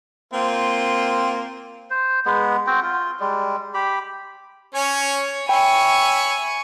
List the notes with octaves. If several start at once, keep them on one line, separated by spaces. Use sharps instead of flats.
A#3 C4 F4
C5
G#3 B3
C4 F#4 G5
F4
G3 G#3
G4 B5
C#4 C#5 G#5
C#5 E5 G5 G#5 B5 C#6